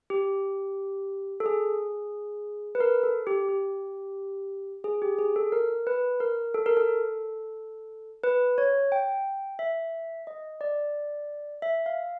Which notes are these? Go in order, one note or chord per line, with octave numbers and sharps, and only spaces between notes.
G4
A4
G#4
B4
A#4
A4
G4
G4
G#4
G4
G#4
A4
A#4
B4
A#4
A4
A#4
A4
B4
C#5
G5
E5
D#5
D5
E5
F5